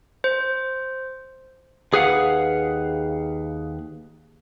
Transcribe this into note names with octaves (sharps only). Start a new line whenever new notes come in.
C5
D#2 G#4 B4 F5 F#5